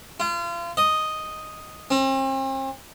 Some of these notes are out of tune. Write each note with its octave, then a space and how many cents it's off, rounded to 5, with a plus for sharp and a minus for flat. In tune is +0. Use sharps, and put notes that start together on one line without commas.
F4 -35
D#5 +0
C4 +40